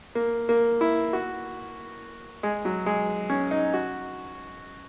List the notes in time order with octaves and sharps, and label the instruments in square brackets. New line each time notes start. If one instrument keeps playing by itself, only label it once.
[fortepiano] A#3
A#3
E4
F#4
G#3
F#3
G#3
C#4
D#4
F#4